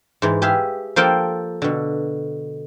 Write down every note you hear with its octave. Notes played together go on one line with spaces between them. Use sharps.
G#2 E3
G4 G#4 E5 F5
F3 A#3 A4 C5 F5 G5
B2 D3